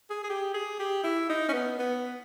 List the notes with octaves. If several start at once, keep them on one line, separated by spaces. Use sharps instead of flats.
G#4
G#4
G4
G#4
G4
E4
D#4
C#4
B3
B3